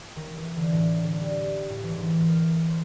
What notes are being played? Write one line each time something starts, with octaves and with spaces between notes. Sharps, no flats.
D#3
E3
D3
A2
D3
G3
A2
E3
G#2
A#4
C5